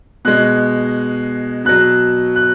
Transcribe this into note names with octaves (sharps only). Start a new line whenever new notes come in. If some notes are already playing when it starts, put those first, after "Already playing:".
B2 G#3 F#6
B2 F#3 F#6
F#6